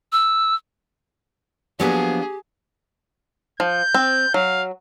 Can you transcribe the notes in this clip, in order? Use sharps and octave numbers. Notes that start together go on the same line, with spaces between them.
E6
F3 F#3 A#3 B3 D4 G4 G#4
F3 G6
C4
F#3 F5